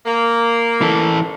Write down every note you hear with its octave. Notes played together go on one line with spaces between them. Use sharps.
A#3
E3 A4